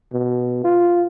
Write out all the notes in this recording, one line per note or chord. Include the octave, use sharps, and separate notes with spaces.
B2
F4